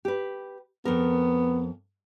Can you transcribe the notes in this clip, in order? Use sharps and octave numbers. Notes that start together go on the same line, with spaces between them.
G4 B4
F2 B3 A#4